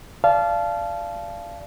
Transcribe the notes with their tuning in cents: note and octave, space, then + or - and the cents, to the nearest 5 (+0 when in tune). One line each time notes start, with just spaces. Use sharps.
D5 +0 F5 -20 A5 -25